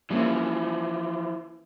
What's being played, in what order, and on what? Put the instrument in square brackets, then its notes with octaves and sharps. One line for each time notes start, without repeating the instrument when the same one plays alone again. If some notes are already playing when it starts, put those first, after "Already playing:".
[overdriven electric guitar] E3 F3 [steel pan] G3 A#3 C#4